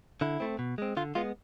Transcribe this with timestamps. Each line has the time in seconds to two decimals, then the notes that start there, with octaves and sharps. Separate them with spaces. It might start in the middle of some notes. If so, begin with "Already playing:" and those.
0.21 D3 E4
0.40 A3 C4
0.59 B2
0.78 G#3 C4
0.97 D3 F4
1.15 G#3 B3 F4